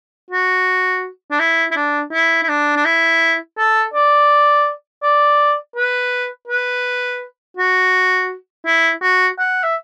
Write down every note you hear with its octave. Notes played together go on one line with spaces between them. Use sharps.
F#4
D4
E4
E4
D4
E4
E4
D4
D4
E4
A4
D5
D5
B4
B4
F#4
E4
F#4
F#5
E5